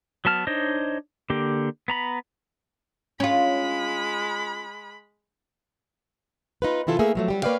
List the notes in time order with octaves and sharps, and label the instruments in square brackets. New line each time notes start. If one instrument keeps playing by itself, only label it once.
[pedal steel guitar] F#3 B3 A5 F6
D4 D#4 C5 C#5 D#5
D3 A#3 G4
B3 A#5 B5
[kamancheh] G#3 B5 [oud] C#4 F4
[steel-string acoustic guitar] D#4 F4 B4
C3 E3 E4 F4 A4
A3 A#3 G#4 E5
F3 F#3 A3
F#3 G3 G4
A#3 B4 C#5 D5 F5 G5